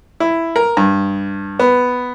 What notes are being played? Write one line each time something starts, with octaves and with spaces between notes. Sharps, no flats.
E4
A#4
G2
B3